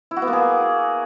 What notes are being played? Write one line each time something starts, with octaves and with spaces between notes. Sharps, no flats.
E4
F#4
B3
A#3
G#4